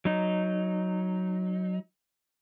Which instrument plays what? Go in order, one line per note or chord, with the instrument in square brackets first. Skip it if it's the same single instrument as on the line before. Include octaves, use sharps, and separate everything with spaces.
[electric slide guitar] F#3 D#4